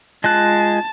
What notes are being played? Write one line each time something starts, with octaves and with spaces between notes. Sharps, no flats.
G#3 F4 A5 F#6